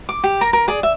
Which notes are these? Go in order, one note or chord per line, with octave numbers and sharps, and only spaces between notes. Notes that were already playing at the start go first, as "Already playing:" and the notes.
D6
G4
A#4 A#5
A#4
G#4 D5
E5